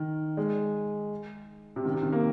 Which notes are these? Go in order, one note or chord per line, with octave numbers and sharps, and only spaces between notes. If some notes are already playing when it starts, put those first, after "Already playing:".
Already playing: D#3
G#3
C3
D#3
C3
D#3
A#3